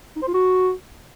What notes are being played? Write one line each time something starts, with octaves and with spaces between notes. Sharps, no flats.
D#4
C5
F4
F#4